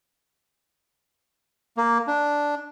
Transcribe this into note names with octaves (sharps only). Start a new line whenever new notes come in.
A#3
D4